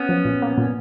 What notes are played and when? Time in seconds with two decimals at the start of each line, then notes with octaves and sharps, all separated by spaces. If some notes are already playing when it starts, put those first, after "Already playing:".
Already playing: B3 C#4
0.09 F3
0.25 A#2
0.42 A#3
0.58 A#2